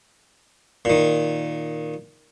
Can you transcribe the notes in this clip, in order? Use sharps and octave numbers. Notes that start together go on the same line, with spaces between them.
A#2 D#3